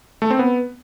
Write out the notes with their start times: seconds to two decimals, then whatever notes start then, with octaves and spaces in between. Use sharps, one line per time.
0.22 A3
0.30 C4
0.39 B3